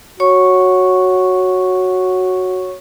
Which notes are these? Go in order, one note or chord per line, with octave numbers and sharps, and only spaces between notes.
F#4 C#5 C#6